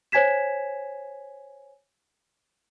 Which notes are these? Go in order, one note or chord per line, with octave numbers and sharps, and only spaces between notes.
C5 C#5 G#5 G#6 B6 E7